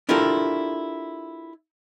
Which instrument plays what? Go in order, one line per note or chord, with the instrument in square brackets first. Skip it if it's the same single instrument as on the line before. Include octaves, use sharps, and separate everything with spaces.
[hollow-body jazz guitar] D4 E4 F4 G4 A4 A#4